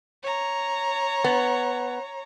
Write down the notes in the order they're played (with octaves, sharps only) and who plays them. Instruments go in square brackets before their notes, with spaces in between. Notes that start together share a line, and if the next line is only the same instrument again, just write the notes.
[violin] C#5 A#5
[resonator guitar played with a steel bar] B3